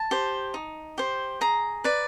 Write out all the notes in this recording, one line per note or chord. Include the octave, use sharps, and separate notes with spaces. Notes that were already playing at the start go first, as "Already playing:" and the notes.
Already playing: A5
G4 C5
D#4
G4 C5
G#4 A#5
B4 D5